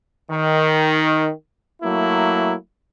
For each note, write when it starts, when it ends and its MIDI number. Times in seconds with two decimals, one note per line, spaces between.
0.30 1.31 51
1.83 2.54 54
1.83 2.54 57
1.83 2.54 58
1.83 2.54 64